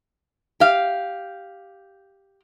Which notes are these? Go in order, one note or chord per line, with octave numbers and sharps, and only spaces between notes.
G4 F5